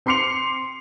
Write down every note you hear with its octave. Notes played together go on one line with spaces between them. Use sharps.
C4 C6 D6 C7 C#7 F7